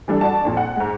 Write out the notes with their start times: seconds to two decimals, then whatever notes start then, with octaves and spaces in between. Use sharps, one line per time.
0.08 E3 G3 D4 A4
0.21 F#4 D5 A5
0.45 F2 A#2
0.57 F#5
0.76 G#2 G#3